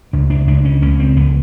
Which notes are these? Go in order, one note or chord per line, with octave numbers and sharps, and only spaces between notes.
C#2 D4
D4
C#2 D4
C#4
C#2 C#4
C4
C#2 B3